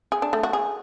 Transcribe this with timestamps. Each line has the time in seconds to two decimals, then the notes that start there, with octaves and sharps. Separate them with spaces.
0.12 G#4
0.22 D4
0.33 A3
0.43 F#4
0.53 G#4